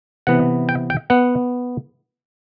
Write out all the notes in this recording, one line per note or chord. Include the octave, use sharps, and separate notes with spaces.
C3 E3 B3 F#5
G5
G5
B3 F#5